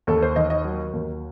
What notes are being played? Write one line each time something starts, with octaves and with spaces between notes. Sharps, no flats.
D#2 A4
C5
D#3 D#5
D#5
F#3
D#2